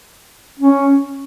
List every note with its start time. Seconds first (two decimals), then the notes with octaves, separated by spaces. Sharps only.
0.59 C#4